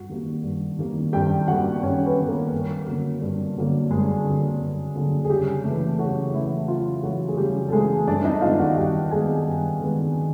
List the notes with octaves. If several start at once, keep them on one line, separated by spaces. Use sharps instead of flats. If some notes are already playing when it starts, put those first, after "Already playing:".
Already playing: G2 F#4
D#3 G3 A#3
G2
D#3 G3 A#3
G2 G4 G5
D#3 G3 A#3 F#4 F#5
G2 C#4 C#5
B3 B4
D#3 G3 A#3
A#3 A#4
G2
D3 F#3 A#3
G2
D3 F#3 A#3
G2 G#3 G#4
D3 F#3 A#3
G2
D3 F#3 A#3
G#4
C#3 G3 G4
E3 A3
C#3 F#3 F#4
E3 A3 E4
C#3 F4
E3 F#3 A3 F#4
G#4
C#3 G3 G4
A4
E3 G#3 A3 G#4
G2 D4 D5
D#4 D#5
D#3 G#3 B3 F4 F5
F#4 F#5
G2 G4 G5
D#3 G#3 B3 G#4 G#5
G2
D#3 G#3 B3